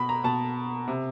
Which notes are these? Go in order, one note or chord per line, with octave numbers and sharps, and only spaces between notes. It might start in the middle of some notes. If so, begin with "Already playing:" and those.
Already playing: B2 B5
A#5
B2 A5
C3